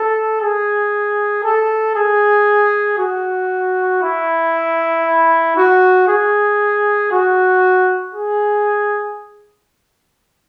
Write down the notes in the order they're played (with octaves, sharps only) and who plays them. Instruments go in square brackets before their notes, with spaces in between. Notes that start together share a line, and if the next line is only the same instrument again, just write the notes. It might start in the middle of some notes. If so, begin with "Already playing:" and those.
Already playing: [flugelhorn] A4
G#4
A4
G#4
F#4
E4
F#4
G#4
F#4
G#4